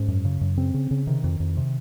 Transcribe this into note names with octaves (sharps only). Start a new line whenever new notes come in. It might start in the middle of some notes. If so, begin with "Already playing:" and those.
Already playing: G#2 C#4
F#2
C#3
F#2
C#3 C4
C#3
C#3
C3 D#3
F2
F2
C3